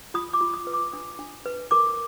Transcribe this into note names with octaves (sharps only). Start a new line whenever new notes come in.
F4 D#6
D6
F4
D#6
B4
D6
D4 D#6
D4
B4
A#4 D6